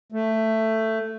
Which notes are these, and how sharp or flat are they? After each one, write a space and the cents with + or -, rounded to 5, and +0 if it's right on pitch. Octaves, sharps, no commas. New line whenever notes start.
A3 +10